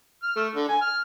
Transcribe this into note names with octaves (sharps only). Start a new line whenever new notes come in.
F6
A3
D3
G#5
F6